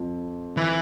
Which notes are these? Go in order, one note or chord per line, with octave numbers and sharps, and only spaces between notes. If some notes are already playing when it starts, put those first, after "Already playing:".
Already playing: F2 F3
E3